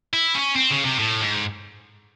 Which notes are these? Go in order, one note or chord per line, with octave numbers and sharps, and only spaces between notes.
E4
C#4
C4
C#3
C3
A2
G#2